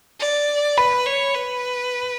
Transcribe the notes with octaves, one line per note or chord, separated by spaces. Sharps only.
D5
B4 B5
C#5
B4